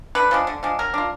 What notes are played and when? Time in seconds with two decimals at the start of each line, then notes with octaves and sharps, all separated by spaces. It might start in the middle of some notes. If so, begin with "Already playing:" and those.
0.15 D3 B4
0.31 F3 G#3 D4
0.47 D3
0.63 F3 G#3 D4
0.79 F#3 A#4
0.94 D4 F4